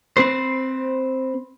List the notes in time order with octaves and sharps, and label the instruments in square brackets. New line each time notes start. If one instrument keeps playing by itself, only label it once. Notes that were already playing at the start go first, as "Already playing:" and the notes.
[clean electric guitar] C4 B4 C5